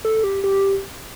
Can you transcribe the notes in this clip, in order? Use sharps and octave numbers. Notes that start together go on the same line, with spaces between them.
A4
G4
G4